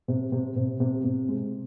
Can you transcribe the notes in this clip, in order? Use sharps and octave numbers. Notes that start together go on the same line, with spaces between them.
C3
C3
C3
C3
C3
G#3